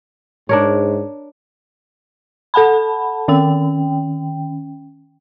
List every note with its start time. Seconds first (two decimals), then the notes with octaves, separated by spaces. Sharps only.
0.49 G#2 D4 A#4 C#5
2.54 A4 F#5 A5 B5
3.28 D#3 C#4 G5